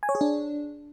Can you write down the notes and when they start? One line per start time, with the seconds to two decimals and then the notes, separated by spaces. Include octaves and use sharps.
0.03 G#5
0.09 C#5
0.15 G#4
0.21 D4